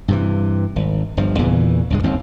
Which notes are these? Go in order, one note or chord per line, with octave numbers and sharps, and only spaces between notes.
G2 C3 E3
G#1
G1 G2 F3
E2 A#2 C#3 E3
C#2 G2 G#3
G1 D#2 C4